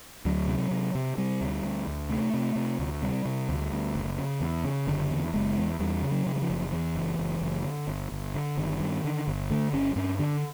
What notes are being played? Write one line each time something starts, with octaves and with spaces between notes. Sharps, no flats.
D2 F#3
C3
C3
C3
C3 G3
D2
D2
D2
C3 A3
C3
C3
D2
C3 G3
C3
D2
D2
F#1
C#3
E2
C#3
F#1 D3
E2
F#1 G#3
E2
E2 G3
C#3
F#3
C#3
F#3
F3
F#1
E2 E3
F#1
F#1
F#1
D3
G1
G1
D3
G1 D#3
G2
D3
G1
D3 A3
G1 C#4
G2 C#4
D3 D4